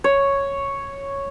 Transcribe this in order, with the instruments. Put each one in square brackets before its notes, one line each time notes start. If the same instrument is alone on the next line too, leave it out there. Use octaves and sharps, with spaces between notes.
[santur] C#5